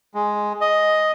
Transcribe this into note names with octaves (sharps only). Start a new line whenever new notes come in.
G#3
D#5